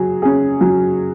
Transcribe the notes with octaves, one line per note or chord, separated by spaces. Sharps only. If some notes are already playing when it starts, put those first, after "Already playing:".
Already playing: F#3 G#4
C#4 G#4
F#3